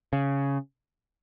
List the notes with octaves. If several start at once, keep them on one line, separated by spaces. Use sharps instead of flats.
C#3